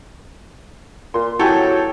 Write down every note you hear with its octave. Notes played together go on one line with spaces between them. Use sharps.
A#2 C6
F#3 E4 G4 A4 C#5 G5 G#5